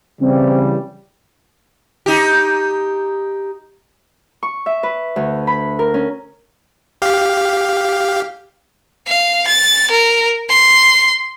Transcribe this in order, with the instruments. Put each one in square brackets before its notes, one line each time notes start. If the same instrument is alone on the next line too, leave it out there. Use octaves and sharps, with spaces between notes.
[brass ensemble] C#3 E3 G3 [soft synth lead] C4
[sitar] D#4 G4
[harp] C#6
E5
B4
D2
B5
A#4
C#4
[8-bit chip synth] G4 F5
[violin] F5
A6
A#4
C6